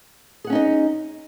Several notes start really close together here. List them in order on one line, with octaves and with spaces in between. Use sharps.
G#4 F#5 C#4 D#4 D#5